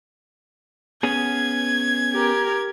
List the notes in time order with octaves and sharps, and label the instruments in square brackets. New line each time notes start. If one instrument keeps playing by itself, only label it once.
[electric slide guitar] B3 C#4 G#4 [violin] G#6
[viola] G4 A#4